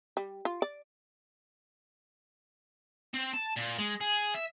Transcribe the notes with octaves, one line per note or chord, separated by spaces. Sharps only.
G3
F4
D5
C4
A5
A#2
G#3
G#4
E5